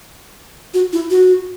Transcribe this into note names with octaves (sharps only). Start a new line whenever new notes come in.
F#4
E4
F#4